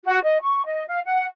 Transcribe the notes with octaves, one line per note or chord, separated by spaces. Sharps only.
F#4
D#5
C#6
D#5
F5
F#5